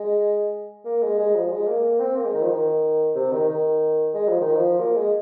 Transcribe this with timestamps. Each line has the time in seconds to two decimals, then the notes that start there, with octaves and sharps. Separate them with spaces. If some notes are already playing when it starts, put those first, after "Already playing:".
Already playing: G#3
0.85 A#3
1.03 G#3
1.19 G#3
1.35 F3
1.52 G#3
1.68 A#3
1.83 A#3
2.00 C4
2.17 A#3
2.25 G#3
2.33 D#3
2.42 F3
2.50 D#3
3.15 C3
3.32 D#3
3.48 D#3
4.14 G#3
4.28 F3
4.41 D#3
4.55 F3
4.80 A#3
4.96 G#3